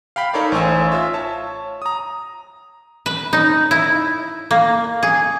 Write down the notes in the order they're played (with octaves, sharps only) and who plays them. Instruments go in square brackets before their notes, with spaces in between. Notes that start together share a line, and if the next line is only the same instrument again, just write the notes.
[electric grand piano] F5 G5 B5 B6
D#4 A4 A#4 C#5 D5 F5
A1 C5 C#5 G#5 E6
F4 E5
C#5 A5
A#5 D#6
[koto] B4
D#4
E4
A#3
G#4